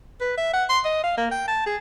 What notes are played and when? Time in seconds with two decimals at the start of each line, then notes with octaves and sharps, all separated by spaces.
0.21 B4
0.37 E5
0.53 F#5
0.70 C6
0.85 D#5
1.04 F5
1.17 A#3
1.31 G5
1.48 A5
1.66 G#4